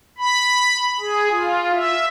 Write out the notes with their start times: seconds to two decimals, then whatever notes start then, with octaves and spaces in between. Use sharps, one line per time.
0.18 B5
1.00 G#4
1.31 F4
1.75 E5